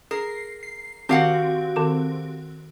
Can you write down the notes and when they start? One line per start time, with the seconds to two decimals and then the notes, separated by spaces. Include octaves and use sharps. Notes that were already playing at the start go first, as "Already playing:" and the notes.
0.11 G#4 A#4 C7
0.63 C7
1.09 D#3 C4 F#4 G4 F5 F#5
1.76 D#3 A4 D6